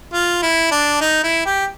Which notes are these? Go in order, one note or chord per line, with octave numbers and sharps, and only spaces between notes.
F4
E4
D4
D#4
E4
G4